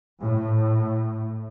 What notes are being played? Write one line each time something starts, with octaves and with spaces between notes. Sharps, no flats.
A2